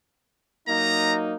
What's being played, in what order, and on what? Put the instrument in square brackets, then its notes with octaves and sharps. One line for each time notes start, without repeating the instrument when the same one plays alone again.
[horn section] F#3 A#3 D#4 [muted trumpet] A#5